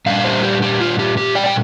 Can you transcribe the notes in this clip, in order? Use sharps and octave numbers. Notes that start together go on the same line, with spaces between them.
A#2 G3 D4 F5
G4 C5
G4
G4
F4
G4
G4
D5 G5
G5